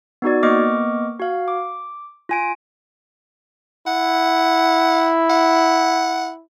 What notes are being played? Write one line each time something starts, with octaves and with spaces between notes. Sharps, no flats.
B3 D#4 F#4 D5
A#3 B3 D#5 C#6 D6 F6
F#4 F5
D6
F4 G#5 D7
E4 F#5
F#5